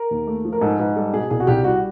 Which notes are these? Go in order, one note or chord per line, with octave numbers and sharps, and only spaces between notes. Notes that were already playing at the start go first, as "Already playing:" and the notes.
Already playing: A#4
D#2
A3
F3
A#4
G#2 A4
G#2 B4
G3 A4
B2 G#4
C2 G#4
F#4
C2 G4
G3 F#4